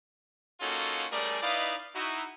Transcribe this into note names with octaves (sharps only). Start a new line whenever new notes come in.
A#3 C#4 D#4 F4 F#4 A4
G3 A3 C#4 G#4 A#4 D5
D#4 E4 B4 D5 D#5 F5
D#4 E4 F#4